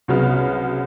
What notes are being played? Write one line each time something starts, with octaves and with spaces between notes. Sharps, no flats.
C2 C#3 F#3 B3 F6